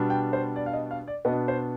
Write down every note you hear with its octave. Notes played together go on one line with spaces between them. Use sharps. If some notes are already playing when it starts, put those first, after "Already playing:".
Already playing: B2 G3 B3 D4
G5
C5
D5
F5
D#5
F5
D5
B2 B3 D4 D#5
C5